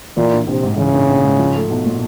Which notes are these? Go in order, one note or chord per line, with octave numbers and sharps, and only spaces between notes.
A#2 E3
A#1
A#1 C3
G#2
C#3 E3
A#1
A#1
G#2
F3
A3
B1
A#2